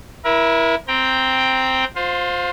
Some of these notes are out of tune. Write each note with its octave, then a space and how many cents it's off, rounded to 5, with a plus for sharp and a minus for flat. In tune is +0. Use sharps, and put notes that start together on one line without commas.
E4 +0 A#4 +35
C4 +0 G5 +0 A#5 +20
F4 +25 C5 +0